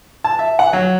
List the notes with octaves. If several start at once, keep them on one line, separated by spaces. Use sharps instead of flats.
A5
E5
F#5
F#3